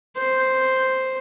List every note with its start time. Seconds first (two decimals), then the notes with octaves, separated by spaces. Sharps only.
0.17 C5